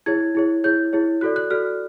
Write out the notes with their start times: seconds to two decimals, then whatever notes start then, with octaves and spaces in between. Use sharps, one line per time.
0.06 E4 G#4 C#5 G#6
0.35 E4 G#4 C#5
0.64 E4 G#4 C#5 G6
0.93 E4 G#4 C#5
1.21 F#4 A4 D5 F#6
1.36 F#6
1.51 F#4 A4 D5 F6